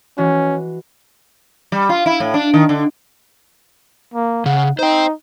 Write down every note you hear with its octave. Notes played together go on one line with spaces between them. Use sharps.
E3 G#3 C#4 F#4
G3
F4
E4
A2
D4
D#3
D3
A#3
C#3 F#5
D#4 C5 G5